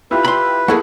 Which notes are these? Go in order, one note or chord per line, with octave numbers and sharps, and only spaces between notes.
E4 F4 G4 B4
B5 C6
A3 A#3 E4 G#4 A4 F#5